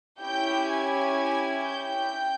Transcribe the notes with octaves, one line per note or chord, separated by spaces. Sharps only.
C#4 E4 G4 G5 G6
G#5 G#6
G5 G6